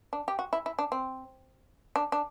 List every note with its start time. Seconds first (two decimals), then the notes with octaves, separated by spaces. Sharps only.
0.13 D4
0.28 G4
0.39 F#4
0.53 E4
0.66 E4
0.79 D4
0.92 C4
1.96 D4
2.12 D4